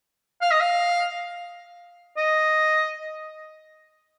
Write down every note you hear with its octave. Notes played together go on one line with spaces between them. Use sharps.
F5
D#5
F5
D#5